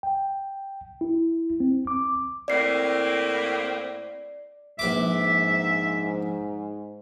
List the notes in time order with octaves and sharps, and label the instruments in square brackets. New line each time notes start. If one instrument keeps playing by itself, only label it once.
[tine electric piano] G5
E4
C4
D6
[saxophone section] A2 A#3 C4 [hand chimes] D5 C7
[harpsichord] A#1 B4 D6 [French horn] G#2 [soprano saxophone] E5